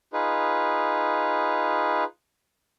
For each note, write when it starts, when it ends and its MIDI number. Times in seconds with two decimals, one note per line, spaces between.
0.13 2.04 63
0.13 2.04 65
0.13 2.04 68
0.13 2.04 71